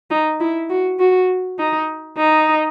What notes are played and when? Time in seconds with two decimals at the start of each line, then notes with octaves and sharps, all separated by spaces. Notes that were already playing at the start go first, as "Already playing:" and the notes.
0.10 D#4
0.40 E4
0.70 F#4
0.99 F#4
1.59 D#4
2.17 D#4